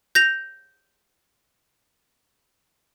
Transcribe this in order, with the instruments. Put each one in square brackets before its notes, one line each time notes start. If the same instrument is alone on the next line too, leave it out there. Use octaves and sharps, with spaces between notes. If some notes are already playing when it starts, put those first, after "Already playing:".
[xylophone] G6 A#6 F7